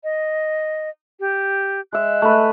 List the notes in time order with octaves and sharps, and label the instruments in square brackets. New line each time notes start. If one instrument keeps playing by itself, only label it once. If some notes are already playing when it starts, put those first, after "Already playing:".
[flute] D#5
G4
[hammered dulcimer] G#3 E5 [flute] F#6
[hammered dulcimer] A3 B4